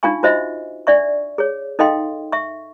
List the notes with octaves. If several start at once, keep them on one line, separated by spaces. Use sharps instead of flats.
D4 D#4 F4 F5 G#5 C#6
F4 F#4 C5 D#5 E5
D4 D5 E5 C#6
G#4 C#5
D#4 A4 D#5 F5 G5 C6
E5 C#6